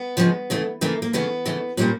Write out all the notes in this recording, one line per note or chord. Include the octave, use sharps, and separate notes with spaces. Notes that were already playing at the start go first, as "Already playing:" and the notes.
Already playing: B3
C#3 F3 G#3
C#3 E3 A3
C#3 E3 A3 A#3
A#3
C#3 E3 A3 B3
C#3 E3 A3
A#2 G3 A#3 C#4